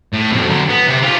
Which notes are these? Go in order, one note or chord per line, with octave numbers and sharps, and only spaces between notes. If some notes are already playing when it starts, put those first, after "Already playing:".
A2
F2 B2
D3 F#3
B3
C3
F4 G4